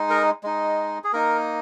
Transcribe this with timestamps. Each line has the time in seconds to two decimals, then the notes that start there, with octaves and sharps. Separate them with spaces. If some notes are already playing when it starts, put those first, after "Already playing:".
Already playing: G#3 D#4
0.10 A#4
0.43 G#3 D#4
1.04 G#4
1.13 A#3 D#4 A#4